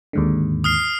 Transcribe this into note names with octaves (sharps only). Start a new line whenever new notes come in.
D#2 G#2 D3
D#6 F6 C7